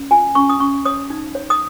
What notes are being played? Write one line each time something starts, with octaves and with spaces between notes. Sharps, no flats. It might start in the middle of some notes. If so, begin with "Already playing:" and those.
Already playing: C#4
F4 G#5
C#4 C#6
D#6
C#4 C#6
C#5 D#6
D#4
C#5
D#6